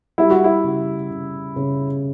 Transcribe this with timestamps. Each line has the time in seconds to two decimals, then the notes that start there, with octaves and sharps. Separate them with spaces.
0.18 G3 E4
0.30 F#4
0.44 E4
0.64 C#3
1.10 C#3
1.56 C#3